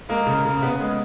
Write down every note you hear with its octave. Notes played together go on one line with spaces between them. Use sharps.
G#3 A#3 A#4
C#3
C#3
C#3 B3 B4
G#3